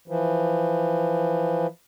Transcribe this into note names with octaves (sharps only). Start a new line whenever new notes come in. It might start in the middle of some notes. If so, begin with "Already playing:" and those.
E3 F3